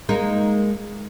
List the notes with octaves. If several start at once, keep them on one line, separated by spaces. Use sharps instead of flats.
G#3 A#3 D#4